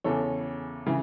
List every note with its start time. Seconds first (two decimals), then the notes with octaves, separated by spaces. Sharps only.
0.04 E2 C#3 E3 A4 C#5
0.86 C#3 E3